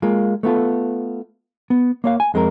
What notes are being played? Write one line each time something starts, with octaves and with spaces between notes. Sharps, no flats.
G#3 A#3 F4
A3 B3 F4 A4
B3
A#3 C#5 F5
G#5
F2 G#3 C4 A4 A#4